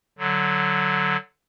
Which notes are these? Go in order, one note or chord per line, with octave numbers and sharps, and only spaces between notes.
D3 F#3